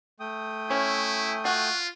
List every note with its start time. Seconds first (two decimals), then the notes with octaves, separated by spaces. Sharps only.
0.20 A3 G5 D#6
0.70 C#4 E4
1.45 F4 F#4